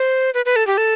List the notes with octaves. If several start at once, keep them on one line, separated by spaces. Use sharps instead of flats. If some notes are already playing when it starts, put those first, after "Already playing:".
Already playing: C5
B4
B4
A4
G4
A4